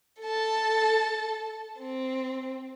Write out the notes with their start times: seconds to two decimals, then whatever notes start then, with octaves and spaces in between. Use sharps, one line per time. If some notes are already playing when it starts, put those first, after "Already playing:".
0.21 A4 A5
1.79 C4